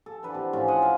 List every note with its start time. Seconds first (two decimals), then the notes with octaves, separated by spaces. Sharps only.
0.06 A4
0.23 E3 D4 B4 F#5
0.34 C3
0.53 A2 F3 C#4 D5
0.68 C5 D#5 F#5 G#5
0.82 E5 F5